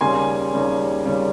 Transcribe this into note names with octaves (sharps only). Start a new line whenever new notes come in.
D#2 C#3 G3 G#5 C6
D#2 C#3 G3
D#2 C#3 G3